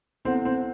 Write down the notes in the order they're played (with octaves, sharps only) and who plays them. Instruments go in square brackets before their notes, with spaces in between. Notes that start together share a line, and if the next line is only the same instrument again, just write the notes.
[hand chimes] B3 E4 A4 C5 F#5 [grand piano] C4
[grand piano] C4